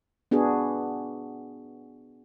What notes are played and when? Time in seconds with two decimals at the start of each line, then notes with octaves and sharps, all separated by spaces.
0.31 B3 D4 F#4 G#4